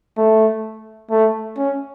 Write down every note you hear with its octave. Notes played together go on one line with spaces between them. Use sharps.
A3
A3
C#4